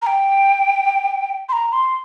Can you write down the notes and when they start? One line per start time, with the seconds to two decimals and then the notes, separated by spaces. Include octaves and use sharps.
0.02 A#5
0.07 G5
1.49 C6
1.53 A#5
1.73 C6